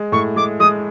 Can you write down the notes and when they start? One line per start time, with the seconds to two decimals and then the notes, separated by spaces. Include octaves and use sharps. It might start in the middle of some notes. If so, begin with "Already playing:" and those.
Already playing: G#3
0.12 A2 C#6
0.36 G#3 D6
0.60 G#3 D#6